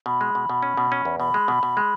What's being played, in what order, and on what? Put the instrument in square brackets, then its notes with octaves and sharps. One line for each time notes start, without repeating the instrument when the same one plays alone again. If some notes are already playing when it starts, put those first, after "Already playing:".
[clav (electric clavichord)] B2 [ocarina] B5
[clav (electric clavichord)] G#3
B2
B2
C#4
B2
C#4
E2
[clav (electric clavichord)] B2 [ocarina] B5
[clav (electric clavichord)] G#3
B2
B2
G#3